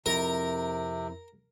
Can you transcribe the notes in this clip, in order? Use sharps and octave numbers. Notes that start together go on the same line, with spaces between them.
F2 C3 E4 A#4 A#5